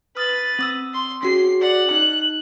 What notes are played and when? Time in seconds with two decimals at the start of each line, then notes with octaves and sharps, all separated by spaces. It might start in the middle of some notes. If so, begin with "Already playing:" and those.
0.17 B4 D#6 F6 A6
0.59 C4 D#6 E6
0.94 C6
1.23 C#4 F#4 G#4 C7
1.62 D5 F#5
1.91 D#4 F#6